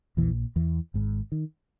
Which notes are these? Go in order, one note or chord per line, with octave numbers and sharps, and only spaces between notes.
A#1 E2 A#2 E3
E2 E3
G#1 G#2
D#3